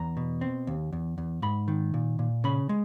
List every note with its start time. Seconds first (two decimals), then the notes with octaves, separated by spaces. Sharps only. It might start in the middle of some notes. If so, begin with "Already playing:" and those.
Already playing: E2 A#5
0.17 B2
0.41 C4
0.67 D#2
0.93 E2
1.18 E2
1.42 G#2 B5
1.68 D#3
1.94 A#2
2.19 A#2
2.44 C#3 B5
2.69 G#3